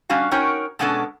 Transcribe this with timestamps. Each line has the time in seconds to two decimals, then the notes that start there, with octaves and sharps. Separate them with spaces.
0.09 G3 C#4 D4 F#4 F5
0.31 C#4 D#4 F#4 A#4 C#5 G5
0.79 B2 G#3 B3 C#4 D4 A4